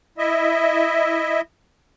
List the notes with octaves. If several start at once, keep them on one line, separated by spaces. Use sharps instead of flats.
E4 D#5 E5